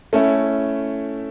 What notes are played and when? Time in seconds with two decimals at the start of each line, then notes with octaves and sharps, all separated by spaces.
0.13 A3 C#4 E4